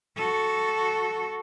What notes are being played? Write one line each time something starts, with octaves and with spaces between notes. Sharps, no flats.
F#4 A4